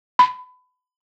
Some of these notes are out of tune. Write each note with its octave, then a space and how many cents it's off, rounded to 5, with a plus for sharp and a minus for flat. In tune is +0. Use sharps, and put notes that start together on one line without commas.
B5 +25